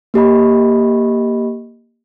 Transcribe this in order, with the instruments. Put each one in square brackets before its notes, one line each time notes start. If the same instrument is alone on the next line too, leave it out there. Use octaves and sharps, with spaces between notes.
[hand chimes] A#3 G4 D#5 B5